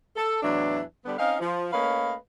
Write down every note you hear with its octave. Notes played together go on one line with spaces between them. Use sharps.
A4
E2 A2 E3 F#3 D4
D3 G3 B3
C4 C#4 D#4 F5
F3
A3 A#3 C#4 B4 D#5 F5